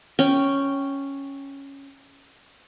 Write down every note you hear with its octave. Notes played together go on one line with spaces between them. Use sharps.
C#4 G5